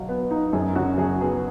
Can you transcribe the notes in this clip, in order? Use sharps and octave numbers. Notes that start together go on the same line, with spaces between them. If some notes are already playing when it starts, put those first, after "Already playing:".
Already playing: B2 F#3 F5
B3
D#4
F#2 G#4
C#3 F#4
F#3 G#4
B3 G#4